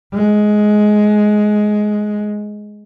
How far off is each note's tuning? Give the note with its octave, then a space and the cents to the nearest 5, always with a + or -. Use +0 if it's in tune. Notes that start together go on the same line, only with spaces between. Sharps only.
G#3 +15